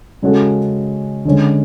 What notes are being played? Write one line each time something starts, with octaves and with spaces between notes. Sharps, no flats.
C#3 G#3 C#4 F#4 A4
D3 G#3 C#4